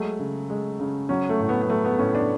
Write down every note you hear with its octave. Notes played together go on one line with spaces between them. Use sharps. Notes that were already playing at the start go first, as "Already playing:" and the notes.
Already playing: F#3 G#3 A3
C#3
G#3
C#3
F#3 C#4
A3
A2
B3
B3
F#3 A3
B3
A2 C#4
D4